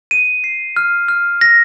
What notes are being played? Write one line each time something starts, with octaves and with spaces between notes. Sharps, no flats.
D#7
C7
F6
F6
A#6